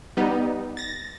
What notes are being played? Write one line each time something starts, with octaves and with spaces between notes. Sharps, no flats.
G3 B3 D#4
A6 A#6